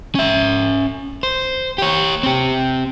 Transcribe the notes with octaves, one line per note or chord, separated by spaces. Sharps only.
C#4 E5
C5
G4 C#5
C4 G4